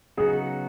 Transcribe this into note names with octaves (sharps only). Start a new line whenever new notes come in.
C#3 F#3 B3 D#4 F#4 G#4